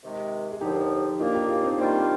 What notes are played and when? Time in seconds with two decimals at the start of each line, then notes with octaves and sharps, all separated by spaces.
0.03 C3 D#3 G#3
0.52 G#4
0.60 D#2 D3 F3 D#4 G4
1.20 D#2 D#3 A#3 D4 F4
1.35 D#4 G4
1.49 F4 G#4
1.64 C4 D#4
1.78 G#2 D#3 G3 A#3 C4 D4 F4